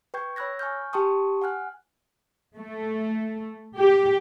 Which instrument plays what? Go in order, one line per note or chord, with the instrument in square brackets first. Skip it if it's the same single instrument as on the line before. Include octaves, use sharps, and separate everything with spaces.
[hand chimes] B4 G5 C#6 G6 G#6
C#5 B5 E6 F#6 G#6 A#6
G#5 C#6 F6 G6
G4 G5 A5 C6 C#6 D#6
F#5 G#5 F6 F#6
[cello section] A3
G4